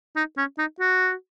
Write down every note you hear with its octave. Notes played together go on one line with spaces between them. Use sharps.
D#4
C#4
D#4
F#4